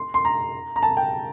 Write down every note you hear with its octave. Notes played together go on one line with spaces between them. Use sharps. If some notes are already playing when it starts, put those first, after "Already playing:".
Already playing: C6
C6
A#5
A#5
A5
G5